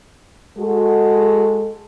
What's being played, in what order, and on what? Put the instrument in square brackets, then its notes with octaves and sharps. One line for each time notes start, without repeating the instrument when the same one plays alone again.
[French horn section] G#3 F#4 A4